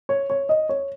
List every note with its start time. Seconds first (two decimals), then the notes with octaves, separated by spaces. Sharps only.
0.09 C#5
0.30 C#5
0.49 D#5
0.69 C#5